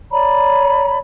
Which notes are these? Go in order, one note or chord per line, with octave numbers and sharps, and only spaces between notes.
C#5 D5 A#5 B5